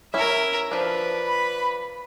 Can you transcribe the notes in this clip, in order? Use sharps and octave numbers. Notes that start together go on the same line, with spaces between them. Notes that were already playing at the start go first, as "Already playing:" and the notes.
C#4 E4 A#4 E5
F3 D4 B4
B5